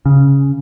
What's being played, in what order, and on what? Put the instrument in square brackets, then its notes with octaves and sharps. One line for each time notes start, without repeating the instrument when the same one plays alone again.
[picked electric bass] C#3